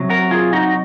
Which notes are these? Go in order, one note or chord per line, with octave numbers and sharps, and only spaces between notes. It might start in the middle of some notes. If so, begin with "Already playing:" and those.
Already playing: C3 F#3
F#4 A#4
F4 G#4
D#4 F#4